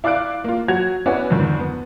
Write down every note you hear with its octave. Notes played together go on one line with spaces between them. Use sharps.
E4 D5 F5 D6 F#6 D7
A#3 F4
F#3 F#4 G#6 F7
B3 C#4 E4 F#4 B4 D5
F2 G#2 D3 D#3
B3